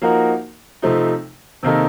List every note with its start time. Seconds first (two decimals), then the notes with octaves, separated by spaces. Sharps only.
0.02 F3 A#3 D#4 F#4 A#4
0.82 C3 F3 A3 C4 D#4
1.63 C3 D#3 A#3 D#4 A4